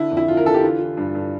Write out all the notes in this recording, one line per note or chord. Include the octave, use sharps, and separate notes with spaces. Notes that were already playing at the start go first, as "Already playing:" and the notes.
Already playing: D3 E4
F2
E4
D3 F4
A#4
D3 A4
G4
E3 F4
E3
G2
G2